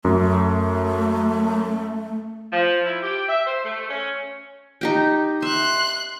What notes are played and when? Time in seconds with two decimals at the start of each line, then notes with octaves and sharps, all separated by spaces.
0.05 F#2 A3
2.52 F3
2.85 E4
3.03 G4
3.28 E5
3.46 C5
3.65 A3
3.90 C#4
4.81 D#4 G4 G5
5.42 E5 C6 F#6